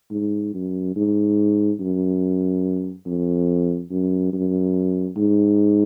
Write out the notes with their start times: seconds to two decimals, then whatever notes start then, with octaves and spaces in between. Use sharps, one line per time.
0.11 G#2
0.54 F#2
0.96 G#2
1.80 F#2
3.06 F2
3.90 F#2
4.33 F#2
5.17 G#2